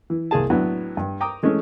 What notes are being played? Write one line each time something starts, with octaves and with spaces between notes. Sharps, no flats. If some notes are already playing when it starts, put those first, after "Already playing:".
E3
C2 A#3 G#4 A5
A2 F#3 B3 D4 E4
G2
G5 A#5 D6 D#6
E3 G#3 A3 C#4